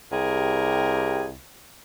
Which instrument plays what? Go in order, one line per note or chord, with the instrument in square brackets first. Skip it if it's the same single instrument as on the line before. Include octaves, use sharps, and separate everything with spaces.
[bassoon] C2 [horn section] G4 G#4 A#4